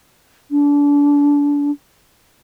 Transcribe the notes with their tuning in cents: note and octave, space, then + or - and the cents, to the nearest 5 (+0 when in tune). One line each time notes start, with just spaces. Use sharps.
D4 -30